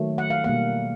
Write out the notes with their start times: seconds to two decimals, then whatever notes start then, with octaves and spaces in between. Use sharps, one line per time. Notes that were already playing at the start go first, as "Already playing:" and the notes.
Already playing: D#3 F#3 A3
0.18 F#5
0.30 F5
0.44 B2 G3 A#3 F#5